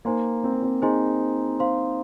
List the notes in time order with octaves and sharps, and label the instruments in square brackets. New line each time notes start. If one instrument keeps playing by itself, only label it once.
[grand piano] A#3 [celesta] D#4 C5 G#5 C6
[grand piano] C4
A#3
C4
[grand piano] D#4 [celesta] G#4 C5 D#5 G#5 C6
[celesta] C5 F5 C6